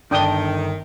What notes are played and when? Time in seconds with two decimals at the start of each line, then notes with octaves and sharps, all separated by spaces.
0.11 G1 D#3 D4 G5 D#6 G7